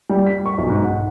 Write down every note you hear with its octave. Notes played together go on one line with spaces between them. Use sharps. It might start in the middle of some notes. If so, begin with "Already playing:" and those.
G3
B6
C#6
B1
G#2
F#5